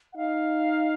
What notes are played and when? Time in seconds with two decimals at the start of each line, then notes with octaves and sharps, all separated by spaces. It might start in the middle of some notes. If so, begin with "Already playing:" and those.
0.13 F#5
0.16 D#4 F5